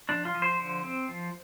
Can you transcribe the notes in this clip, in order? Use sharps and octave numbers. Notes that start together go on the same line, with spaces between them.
F3 D4
F4
F3
C5
D3
C4
F3